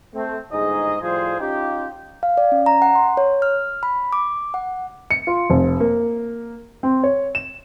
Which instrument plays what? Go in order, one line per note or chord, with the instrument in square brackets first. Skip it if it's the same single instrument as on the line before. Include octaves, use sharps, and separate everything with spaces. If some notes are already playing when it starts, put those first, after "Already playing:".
[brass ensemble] A3 C4
G1 G#2 D#4 G#4 D#5
A2 F3 G3 F4 G#4 C5
C#4 D#4 F4 G4
[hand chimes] F5
D5
C#4
A#5
F#5
C6
C#5
F6
B5
D6
F#5
[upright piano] C#7
F4
F1
A#3
C4
C#5
E7